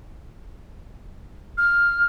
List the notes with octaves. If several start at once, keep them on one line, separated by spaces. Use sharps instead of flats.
F6